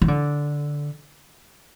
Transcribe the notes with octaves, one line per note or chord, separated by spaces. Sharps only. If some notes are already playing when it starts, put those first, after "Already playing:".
E3
D3